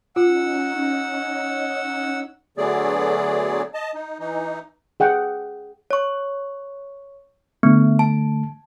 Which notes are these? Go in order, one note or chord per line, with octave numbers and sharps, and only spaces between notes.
C#4 D#4 F4 F#5 E6
D3 F#3 A3 B3 G#4 D5
D#5 A5
D#4
E3 D#4
G#4 F#5 G5
C#5 C#6
D3 A3 B3
A5